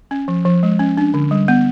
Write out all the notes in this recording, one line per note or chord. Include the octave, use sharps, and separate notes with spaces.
C#4
F3
F3
G#3
C#4
D4
D3
G3
B3